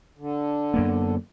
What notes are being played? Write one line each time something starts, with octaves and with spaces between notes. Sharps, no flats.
D3
F#2 A#3 B3